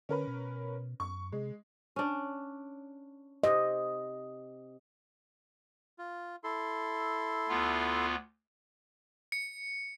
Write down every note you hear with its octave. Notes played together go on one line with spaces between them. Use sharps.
D3 C#4 A#4 B4
B2
F#2 C#6
C3 G#3
C#4 D4
C3 D#5
F4
E4 A4 C6
D2 B3 F4
C#7